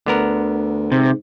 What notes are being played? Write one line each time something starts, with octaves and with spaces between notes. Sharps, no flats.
D2 D3 B3 A#4
G#2 C3